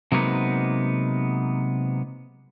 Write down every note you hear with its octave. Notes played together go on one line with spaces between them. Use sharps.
C3 F#3 G#3 A#3 B3 D#4